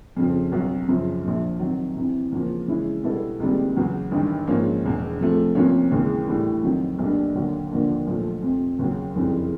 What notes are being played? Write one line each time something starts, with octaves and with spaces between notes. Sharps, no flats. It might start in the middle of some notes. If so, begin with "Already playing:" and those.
F2 C#3 F3
C2 B2 F#3
F#2 C#3 F3
A#1 A#2 F3
C3 D#3 F#3
E2 C3 E3
E2 C#3 F3 A#3
C#3 E3 G#3 C#4 E4
B2 G3 B3 E4 A4
C#2 C3 D#3 G3 A#3
E2 C#3 F#3 B3
A1 G2 D#3
G#2 F3 A#3 C#4
E1 E2 B2
C3 F3 A3
C2 C3 F3 A#3 C#4
D#2 C#3 E3 G#3
A2 E3 G3
F2 C3 D#3 F#3
B1 B2 G3 A#3 D4
D#2 D3 F#3 A#3
D#2 D3 F3 A#3 D4
B1 A#2 F3 A3
F2 C3 F3
D#2 C#3 F#3
F#1 F2 C#3 E3 G3